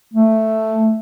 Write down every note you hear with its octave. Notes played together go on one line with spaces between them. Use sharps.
A3